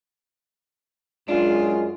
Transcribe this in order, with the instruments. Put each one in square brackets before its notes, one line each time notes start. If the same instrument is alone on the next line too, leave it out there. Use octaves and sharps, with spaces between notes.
[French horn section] F#2 G#3 [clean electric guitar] D4 [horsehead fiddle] F4